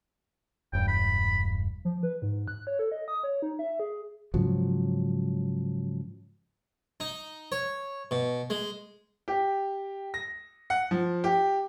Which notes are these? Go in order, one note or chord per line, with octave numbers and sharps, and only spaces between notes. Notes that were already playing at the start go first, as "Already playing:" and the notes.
E1 G2 G5
B5
F3
B4
G#2
F#6
C#5
A4
D#5
D#6
C#5
D#4
E5
G#4
G#2 C#3 F3 F#3
D#4
C#5
B2
G#3
G4
A#6
F#5
F3
G4